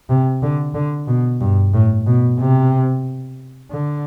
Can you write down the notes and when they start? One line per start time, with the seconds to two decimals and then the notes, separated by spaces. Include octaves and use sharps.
0.10 C3
0.43 D3
0.75 D3
1.08 B2
1.41 G2
1.73 A2
2.07 B2
2.39 C3
3.71 D3